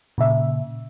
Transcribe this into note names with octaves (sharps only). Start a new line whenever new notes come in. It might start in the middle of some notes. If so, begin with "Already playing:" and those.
A#2 C#3 E5